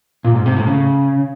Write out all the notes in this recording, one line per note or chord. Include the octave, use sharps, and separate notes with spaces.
A#2
G#2
C3
A2
C#3